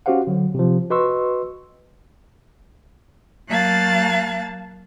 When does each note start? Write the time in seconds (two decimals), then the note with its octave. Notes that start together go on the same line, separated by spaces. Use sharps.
0.06 C#4 F#4 G4 C5 F5 F#5
0.27 D3 F#3
0.54 C3 F3
0.90 F#4 B4 D#5 C6 C#6 E6
3.47 F#3 A#3 F5 A5 F#6 A6